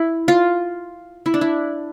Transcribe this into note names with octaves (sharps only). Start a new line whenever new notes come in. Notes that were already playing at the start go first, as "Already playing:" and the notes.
Already playing: E4
F4
E4
D4
E4